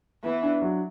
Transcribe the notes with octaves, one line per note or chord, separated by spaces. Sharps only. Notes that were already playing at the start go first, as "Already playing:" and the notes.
E3 B3
D4
F#3